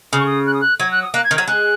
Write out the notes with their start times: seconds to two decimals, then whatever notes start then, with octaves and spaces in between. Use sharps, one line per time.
0.13 C#3 D#6
0.20 C#6
0.27 D#6
0.46 F#6
0.54 D#6
0.61 F#6
0.80 F#3 G#6
0.92 F#6
1.02 D#6
1.14 A#3 F#6
1.24 G#6
1.31 D#3
1.36 F#3 G#6
1.48 G#3 F#6